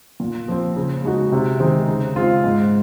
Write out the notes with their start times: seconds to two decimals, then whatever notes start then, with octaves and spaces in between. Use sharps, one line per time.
0.20 A#2
0.48 F3 C4
0.76 C#3
1.04 G#3 D#4 F#4
1.32 C3
1.60 D#3 G#3 C4 D#4
1.88 C#3
2.16 G#3 C4 F4
2.44 G#2